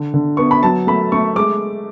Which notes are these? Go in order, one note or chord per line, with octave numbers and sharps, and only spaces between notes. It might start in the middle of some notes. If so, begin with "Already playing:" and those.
Already playing: D3
D3
B3 C#6
B5
F#3 A5
A3 B5
A3 C#6
G#3 D6